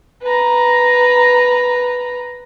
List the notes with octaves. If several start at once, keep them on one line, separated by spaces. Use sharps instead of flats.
B4 A#5